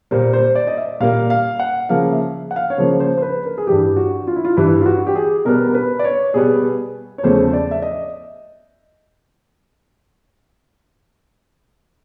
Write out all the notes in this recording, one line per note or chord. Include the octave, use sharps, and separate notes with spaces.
A#2 G3 A#3 C5
C5
D5
D#5
E5
A#2 G3 A#3 F5
F5
F#5
C#3 F3 A#3 F5
E5
F#5
F5
C#5
C#3 F3 A#3 C5
C5
C5
B4
A#4
G#4
G2 E3 G3 G4
F#4
F4
E4
F4
G2 E3 G3 E4
F4
F#4
G4
G#4
B2 G3 B3 A#4
A#4
B4
D5
C#5
B2 G3 B3 G#4
C#5
E2 C#3 F3 A3 C5
D5
E5
D#5